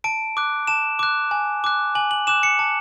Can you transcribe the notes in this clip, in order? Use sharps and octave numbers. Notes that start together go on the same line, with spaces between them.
A5 D7
D6 F#6
A5 E7
D6 F#6
G#5
D6 F#6
G#5 F#7
F#7
D6 F#6 E7
C#7
A5